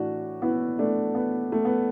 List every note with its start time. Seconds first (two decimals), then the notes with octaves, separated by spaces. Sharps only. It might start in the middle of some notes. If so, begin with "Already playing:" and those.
Already playing: A2 E3 D4 F#4
0.42 B3 E4
0.79 A3 D4
1.15 B3
1.52 A3
1.65 B3